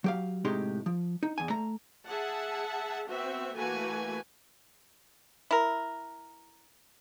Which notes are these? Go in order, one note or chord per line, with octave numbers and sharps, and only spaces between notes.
F#3 G4 F5
A2 C3 G#3 D#4 G4 C6
F3
D#4
E2 G#5
A3 A#5
G#4 E5 F#5 A5
B3 C4 F#4 E5
E3 A3 A#3 F#4 B4 G#5
E4 A#4